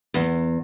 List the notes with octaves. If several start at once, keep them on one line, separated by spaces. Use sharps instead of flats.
E2